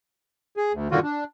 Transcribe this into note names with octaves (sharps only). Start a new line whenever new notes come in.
G#4
D2
G2 A#2 D3 D#3 F4 F#4
D4